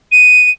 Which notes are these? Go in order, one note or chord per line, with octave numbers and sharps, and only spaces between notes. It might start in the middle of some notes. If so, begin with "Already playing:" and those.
D#7